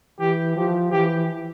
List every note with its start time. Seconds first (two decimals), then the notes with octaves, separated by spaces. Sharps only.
0.20 E3 G4
0.56 F3 G4
0.92 E3 G4